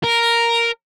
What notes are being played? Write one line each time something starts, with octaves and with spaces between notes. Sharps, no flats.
A#4